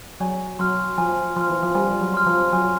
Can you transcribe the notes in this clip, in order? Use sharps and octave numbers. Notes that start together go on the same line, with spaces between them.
F#3 G#5
F#3 C6 F6
F3 G#5
F3 C6 F6
E3
F3
G3 G#5
F#3
C6 F6
F3
F#3 G#5